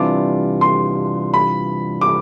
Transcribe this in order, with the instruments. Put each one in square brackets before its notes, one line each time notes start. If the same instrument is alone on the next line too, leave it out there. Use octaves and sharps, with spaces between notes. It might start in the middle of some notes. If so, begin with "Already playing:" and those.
Already playing: [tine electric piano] C3 E3 G3 D4 F4 [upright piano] D6
[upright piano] C6
B5
D6